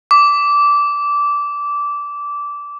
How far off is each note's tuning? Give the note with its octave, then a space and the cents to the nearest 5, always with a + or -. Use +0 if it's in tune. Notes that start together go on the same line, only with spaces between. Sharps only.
D6 -15